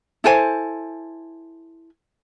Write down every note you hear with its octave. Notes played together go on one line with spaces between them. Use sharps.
E4 A4 C5 G#5